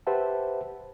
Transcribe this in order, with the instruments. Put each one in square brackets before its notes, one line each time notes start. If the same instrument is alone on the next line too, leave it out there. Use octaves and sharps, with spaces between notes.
[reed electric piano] G4 B4 C5 E5 F#5 A5